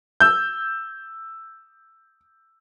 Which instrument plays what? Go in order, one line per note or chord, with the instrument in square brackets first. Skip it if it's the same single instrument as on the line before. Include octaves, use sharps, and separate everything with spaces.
[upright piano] E6 G6